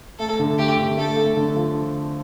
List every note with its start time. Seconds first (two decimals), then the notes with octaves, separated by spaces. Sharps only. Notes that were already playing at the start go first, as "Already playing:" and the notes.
0.19 A3 A4
0.39 D3
0.58 A3 G4
0.78 D3
0.97 A3 A4
1.16 A3
1.37 D3
1.55 F3